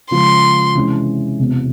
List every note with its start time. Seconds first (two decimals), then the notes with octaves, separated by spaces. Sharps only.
0.11 C#3 F3 G#3 C6
0.75 C3 E3 G#3 C#4 E4
1.39 E1 E2 C3